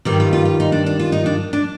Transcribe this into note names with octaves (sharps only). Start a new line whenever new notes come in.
G2 D#3 G3 G4
F4
F4
F4
D#4
D4
D4
F4
D#4
D4
D4